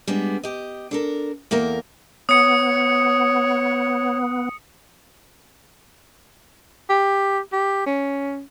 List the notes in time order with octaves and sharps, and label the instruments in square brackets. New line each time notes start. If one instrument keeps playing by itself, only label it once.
[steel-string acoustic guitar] G3 G#3 B3 D4
G4 D#5
D4 A4 A#4
E2 A#3 A4 A#4
[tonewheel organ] B3 [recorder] C#5 [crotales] D#6 C#7
[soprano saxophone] G4
G4
C#4